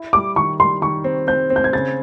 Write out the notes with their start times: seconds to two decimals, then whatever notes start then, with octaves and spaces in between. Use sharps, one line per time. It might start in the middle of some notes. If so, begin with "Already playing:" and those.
Already playing: E4
0.13 G3 D6
0.36 D#3 C#6
0.60 G3 C6
0.82 D#3 C#6
1.04 C4
1.27 C4 G6
1.50 C4
1.56 G6
1.64 G#6
1.73 C#3 A6